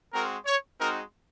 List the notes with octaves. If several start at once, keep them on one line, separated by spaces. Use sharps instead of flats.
G#3 C4 F#4 A#4
C#5
G#3 C4 D#4 F#4 A#4